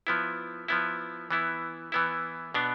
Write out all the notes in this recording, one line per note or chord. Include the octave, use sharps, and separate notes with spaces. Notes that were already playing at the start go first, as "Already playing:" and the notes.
F3 B3 E4
F3 B3 E4
E3 B3 E4
E3 B3 E4
B2 B3 D4